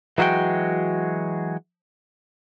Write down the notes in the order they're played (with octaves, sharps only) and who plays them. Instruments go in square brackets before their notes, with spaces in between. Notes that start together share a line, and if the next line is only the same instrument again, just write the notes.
[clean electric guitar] E3 F#3 G#3 F#4 G5